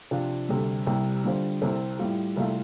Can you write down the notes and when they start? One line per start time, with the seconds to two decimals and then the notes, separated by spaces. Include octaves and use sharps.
0.11 C3 F3 D4 F4
0.49 D2 C3 G3
0.87 C2 C3 G3
1.24 D3 G3 D4 F4 C5
1.61 C2 C3 G3 C4 A4
1.99 A2 G3 F4
2.37 C2 C3 A3 F4 A4